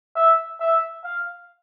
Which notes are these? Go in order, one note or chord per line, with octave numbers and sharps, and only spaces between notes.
E5
E5
F5